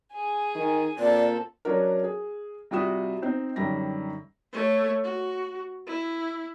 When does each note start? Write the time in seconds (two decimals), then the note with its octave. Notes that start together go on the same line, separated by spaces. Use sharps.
0.13 G#4 G#5
0.55 D#3
0.99 A#2 C4 A4 D5
1.65 F#3 C#4 D4 F#4 A#4
2.04 G#4
2.71 C3 G3 F4 F#4 D#6 E7
3.22 C4 D#4 C5
3.56 F#2 D3 D#3 G3 A#6
4.52 A3 C#5
5.03 F#4
5.87 E4